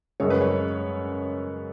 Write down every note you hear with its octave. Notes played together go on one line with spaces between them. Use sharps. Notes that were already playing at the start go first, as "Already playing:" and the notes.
F#2 C#3 G#3 C#5
B4
C#5